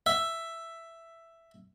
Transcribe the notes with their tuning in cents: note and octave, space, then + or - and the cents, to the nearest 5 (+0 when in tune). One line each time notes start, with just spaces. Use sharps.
E5 +5